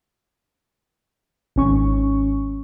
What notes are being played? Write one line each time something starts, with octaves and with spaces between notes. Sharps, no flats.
G#1 C#4 C#6